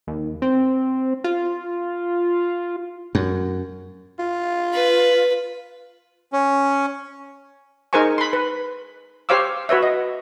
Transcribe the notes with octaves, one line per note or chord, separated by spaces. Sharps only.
D#2
C4
F4
F#2
F4
B4
C#4
D#4 G#4 A#4 C5 G#5 C#6
B5 C6
B4
G4 C5 C#5 F5 D6 E6
F#4 B4 C#5 E5
D#5